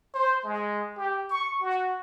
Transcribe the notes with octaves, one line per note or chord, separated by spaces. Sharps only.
C5
G#3
G4
C#6
F#4